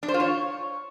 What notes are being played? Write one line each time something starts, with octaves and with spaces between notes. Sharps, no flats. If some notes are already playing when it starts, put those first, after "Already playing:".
D4
C5
F4
C#5